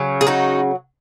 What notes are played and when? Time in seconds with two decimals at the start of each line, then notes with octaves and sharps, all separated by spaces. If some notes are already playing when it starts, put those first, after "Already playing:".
Already playing: C#3 F#3
0.21 G#4
0.27 D#4 F#4